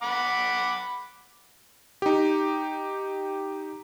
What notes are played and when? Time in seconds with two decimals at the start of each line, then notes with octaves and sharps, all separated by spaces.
0.02 F#5 B5 D6
2.02 D#4 G4